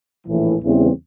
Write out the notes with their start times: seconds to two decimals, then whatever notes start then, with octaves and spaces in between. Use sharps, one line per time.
0.27 A#1 A2 E3
0.62 E2 C#3 E3 G3 C4